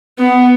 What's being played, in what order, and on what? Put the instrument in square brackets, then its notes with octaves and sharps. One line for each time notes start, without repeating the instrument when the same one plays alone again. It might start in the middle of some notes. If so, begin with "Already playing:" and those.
[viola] B3